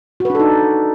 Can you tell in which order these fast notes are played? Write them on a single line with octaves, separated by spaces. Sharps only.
F#4 B4 D4 A4 D#4